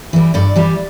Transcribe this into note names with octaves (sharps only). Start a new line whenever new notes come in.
E3 G3
G2 D5
E3 G3